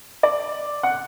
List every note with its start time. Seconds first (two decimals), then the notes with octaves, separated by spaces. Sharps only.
0.23 D5
0.83 F#5